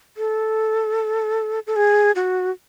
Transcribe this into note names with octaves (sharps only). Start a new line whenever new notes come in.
A4
A4
G#4
F#4